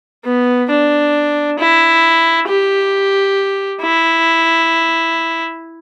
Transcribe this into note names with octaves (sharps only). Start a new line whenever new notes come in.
B3
D4
E4
G4
E4